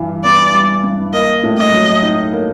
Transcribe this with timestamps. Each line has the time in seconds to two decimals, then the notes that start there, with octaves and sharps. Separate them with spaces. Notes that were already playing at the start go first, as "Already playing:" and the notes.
Already playing: G2 E3 G3
0.24 B3 D5
0.54 G3
0.84 G2
1.13 A#3 D#5
1.43 A2
1.58 D#5
1.72 F#3
2.03 D#4
2.32 A#3